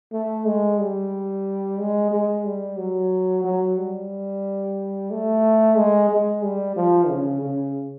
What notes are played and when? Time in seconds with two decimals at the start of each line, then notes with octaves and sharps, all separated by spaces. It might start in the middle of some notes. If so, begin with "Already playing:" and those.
0.13 A3
0.46 G#3
0.80 G3
1.79 G#3
2.11 G#3
2.45 G3
2.78 F#3
3.44 F#3
3.78 G3
5.11 A3
5.76 G#3
6.09 G#3
6.43 G3
6.76 F3
7.08 C#3
7.42 C#3